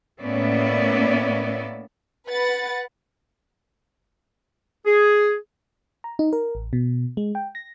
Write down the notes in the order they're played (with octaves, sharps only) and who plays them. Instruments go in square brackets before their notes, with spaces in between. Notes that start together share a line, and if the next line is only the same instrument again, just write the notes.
[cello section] A2 A#3 B3 C#4 D5 E5
[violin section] B4 F#5 A6
[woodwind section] G#4
[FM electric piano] A#5
D#4
A#4
A1
B2
G#3
G5
A#6